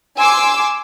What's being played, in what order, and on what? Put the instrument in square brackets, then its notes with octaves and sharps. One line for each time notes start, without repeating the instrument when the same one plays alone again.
[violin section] G#5 C6 D6 E6